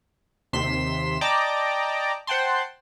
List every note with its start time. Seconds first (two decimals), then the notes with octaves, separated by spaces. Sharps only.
0.53 D#2 C3 C6 B6 E7
1.21 D5 D#5 G5 A5 A#5 D6
2.27 C5 F#5 G5 A5 C6